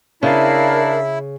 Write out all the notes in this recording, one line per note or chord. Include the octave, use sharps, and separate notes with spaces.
C#3 D4 E4 A#4 E5 F5